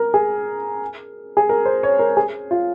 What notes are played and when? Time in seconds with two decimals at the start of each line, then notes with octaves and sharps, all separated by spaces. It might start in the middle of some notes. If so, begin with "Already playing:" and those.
Already playing: A#4
0.14 G#4
1.37 G#4
1.49 A#4
1.66 C5
1.83 C#5
1.99 A#4
2.17 G#4
2.51 F4